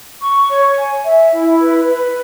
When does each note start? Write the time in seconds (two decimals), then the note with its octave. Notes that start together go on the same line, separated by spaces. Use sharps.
0.21 C#6
0.49 C#5
0.76 G#5
1.04 E5
1.32 E4
1.60 B4
1.88 B4